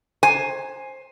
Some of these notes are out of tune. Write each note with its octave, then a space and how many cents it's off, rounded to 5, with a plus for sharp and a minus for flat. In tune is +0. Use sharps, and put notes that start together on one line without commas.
C5 +15 G#5 +0